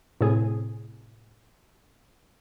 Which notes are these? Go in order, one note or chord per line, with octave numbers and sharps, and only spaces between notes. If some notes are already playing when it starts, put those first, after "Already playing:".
A2 C3 G#4